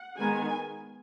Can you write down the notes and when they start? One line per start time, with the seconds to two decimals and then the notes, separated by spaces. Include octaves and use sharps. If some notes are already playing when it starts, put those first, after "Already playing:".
Already playing: F#5
0.18 D#3 G#3 B3 G#5